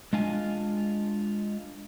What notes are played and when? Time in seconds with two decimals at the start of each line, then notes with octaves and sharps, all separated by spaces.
0.13 G#3 D4 F4 F5 G#5